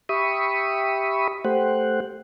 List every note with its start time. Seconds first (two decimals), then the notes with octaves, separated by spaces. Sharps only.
0.09 G4 E5 B5 C#6 D#6
1.45 A3 G4 C5 F#5